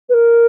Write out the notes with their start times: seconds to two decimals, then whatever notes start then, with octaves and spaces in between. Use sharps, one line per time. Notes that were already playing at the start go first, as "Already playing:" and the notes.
0.09 B4
0.13 A#4